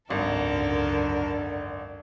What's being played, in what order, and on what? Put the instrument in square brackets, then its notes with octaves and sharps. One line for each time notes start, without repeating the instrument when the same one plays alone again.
[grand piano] G#1 [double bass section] C#2 F#2 [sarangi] D3 [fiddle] A4 A#4